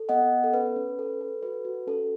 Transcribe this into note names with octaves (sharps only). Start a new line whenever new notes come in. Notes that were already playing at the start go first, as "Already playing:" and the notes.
Already playing: A4
B3 D#5 F#5
B3
A4
C#4 B4
C#4
A4
A4
F#4 B4
F#4
C#4 A4